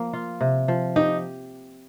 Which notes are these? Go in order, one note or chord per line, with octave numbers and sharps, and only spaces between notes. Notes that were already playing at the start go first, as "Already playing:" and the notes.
Already playing: F3 A#3
F4
C3
F3
D#4 G4